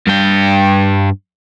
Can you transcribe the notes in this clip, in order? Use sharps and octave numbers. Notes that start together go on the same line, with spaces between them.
G2 G5